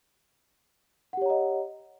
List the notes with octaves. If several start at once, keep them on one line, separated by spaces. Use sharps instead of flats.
G4 C#5 D#5 F#5 A#5